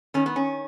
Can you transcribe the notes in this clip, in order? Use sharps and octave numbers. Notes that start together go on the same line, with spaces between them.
D#3 C#4
B3
C#4